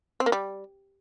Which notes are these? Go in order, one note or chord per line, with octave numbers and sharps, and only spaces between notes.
C4
A#3
G3